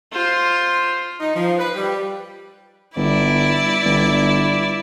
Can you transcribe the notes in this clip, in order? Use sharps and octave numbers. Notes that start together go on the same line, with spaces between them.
F4 C5
D#4
F3
B4
G3
G1 E4 D5
G1